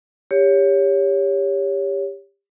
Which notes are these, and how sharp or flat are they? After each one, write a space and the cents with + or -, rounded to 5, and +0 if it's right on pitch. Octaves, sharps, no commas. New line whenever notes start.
G4 +20 C#5 +10